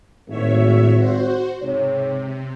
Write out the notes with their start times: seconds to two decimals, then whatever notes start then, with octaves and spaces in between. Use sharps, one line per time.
0.28 G#1 A2 C#5 E5
0.94 F#4 C5
1.61 G#2 C3 C#5